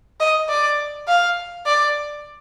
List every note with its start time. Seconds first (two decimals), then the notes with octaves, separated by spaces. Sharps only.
0.20 D#5
0.49 D5
1.08 F5
1.66 D5